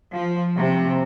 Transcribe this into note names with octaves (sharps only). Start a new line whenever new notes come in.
F3
C3